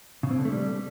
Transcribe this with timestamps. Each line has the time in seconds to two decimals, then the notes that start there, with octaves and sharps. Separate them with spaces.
0.23 C#3
0.31 C4
0.38 D3
0.45 A3
0.52 G3